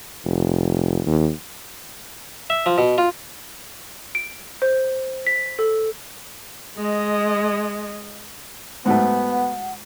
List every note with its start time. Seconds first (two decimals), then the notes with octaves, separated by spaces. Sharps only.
0.25 F1
1.06 D#2
2.50 E5
2.66 F3
2.78 B2
2.98 F4
4.15 D7
4.62 C5
5.27 B6
5.59 A4
6.77 G#3 D#5
8.86 G#2 F#3 A3 B3 F#5